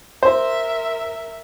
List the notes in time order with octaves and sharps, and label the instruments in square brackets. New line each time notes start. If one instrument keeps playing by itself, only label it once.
[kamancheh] A#4 E5 [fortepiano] C5